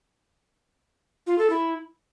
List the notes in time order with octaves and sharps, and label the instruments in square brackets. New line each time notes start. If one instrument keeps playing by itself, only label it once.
[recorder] F4
A4
E4